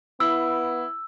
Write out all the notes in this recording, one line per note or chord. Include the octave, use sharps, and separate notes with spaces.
B3 E4 E6